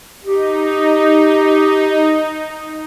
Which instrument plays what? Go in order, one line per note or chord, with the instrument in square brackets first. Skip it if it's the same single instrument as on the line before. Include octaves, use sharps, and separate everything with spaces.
[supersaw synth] D#4 [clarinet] G4